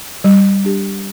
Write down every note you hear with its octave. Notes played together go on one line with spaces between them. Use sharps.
G3
D4 G4